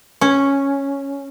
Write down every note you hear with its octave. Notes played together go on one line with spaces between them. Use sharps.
C#4